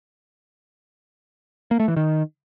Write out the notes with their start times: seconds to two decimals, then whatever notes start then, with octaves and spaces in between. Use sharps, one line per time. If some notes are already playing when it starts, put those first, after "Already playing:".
1.71 A#3
1.80 A3
1.88 E3
1.97 D#3